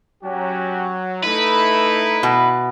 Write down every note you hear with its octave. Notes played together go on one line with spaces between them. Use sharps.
F#3 C#4 F#4 G4
A3 D#4 E4 B4
B2